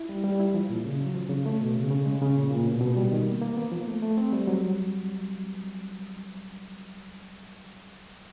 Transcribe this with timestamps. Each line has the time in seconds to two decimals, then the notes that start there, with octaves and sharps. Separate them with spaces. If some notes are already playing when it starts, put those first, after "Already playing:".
Already playing: E4
0.09 G3
0.24 G3
0.40 E4
0.54 F3
0.70 A#2
0.85 C#3
1.00 F#3
1.15 F3
1.29 C#3
1.46 A3
1.61 B2
1.76 C#3
1.91 C#3
2.06 G#3
2.21 C#3
2.36 A#2
2.51 A#2
2.66 B2
2.81 B2
2.97 G3
3.12 D#3
3.26 A#3
3.41 A#3
3.57 B3
3.72 F3
3.87 A3
4.02 A3
4.18 C4
4.33 G3
4.47 F#3